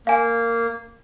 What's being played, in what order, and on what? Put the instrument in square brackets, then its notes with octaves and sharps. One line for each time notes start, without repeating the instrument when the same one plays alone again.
[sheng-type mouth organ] A#3 [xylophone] F5 G#5